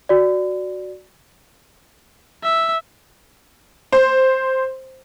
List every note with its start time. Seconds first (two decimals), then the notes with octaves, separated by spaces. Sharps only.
0.09 F#4 D5
2.43 E5
3.92 C5